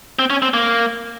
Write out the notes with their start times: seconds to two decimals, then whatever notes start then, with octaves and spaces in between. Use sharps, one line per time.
0.19 C4
0.30 C#4
0.42 C4
0.54 A#3